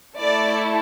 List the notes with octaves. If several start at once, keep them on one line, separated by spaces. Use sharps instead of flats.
A3 E4 A4 D5